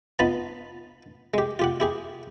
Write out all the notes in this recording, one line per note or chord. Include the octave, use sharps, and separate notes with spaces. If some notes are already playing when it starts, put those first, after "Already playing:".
B3 D#4 F4 F5 A5 B5
G#3 G4
F4 G4 F#5
E4 G4 G#4